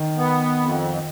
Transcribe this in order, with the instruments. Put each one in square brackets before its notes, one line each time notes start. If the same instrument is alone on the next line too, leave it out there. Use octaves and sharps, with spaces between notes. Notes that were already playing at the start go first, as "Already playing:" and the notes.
Already playing: [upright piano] D#3
[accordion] B3
F2